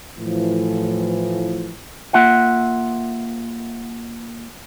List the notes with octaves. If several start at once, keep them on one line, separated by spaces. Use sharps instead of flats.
A2 E3 F3
A#3 F4 E5 F#5